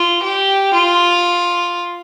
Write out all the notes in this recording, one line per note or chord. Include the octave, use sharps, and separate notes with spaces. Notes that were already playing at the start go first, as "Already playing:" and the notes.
Already playing: F4
G4
F4